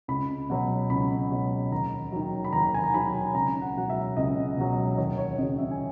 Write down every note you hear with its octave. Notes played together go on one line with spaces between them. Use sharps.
C#2 B5
B2 F#3
C#2 B5
B2 F#3
D#2 A#5
D#3 F#3
B5
D#2 A#5
G#5
A#5
D#3 F#3 B5
C#2 A#5
F#5
B2 F#3 F#5
E5
C#2 D#5
B2 F#3
D#2 C#5
C#5
C#3 F#3 D#5
E5
G#5